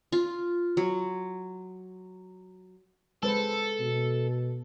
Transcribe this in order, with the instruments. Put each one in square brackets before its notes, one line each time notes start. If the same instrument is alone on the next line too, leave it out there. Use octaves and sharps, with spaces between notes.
[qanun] F4
F#3
[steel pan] G#3 B4 C5 [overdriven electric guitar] A4
[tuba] B2